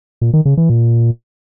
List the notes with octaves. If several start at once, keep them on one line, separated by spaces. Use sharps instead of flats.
A#2
D#3
C#3
E3
A#2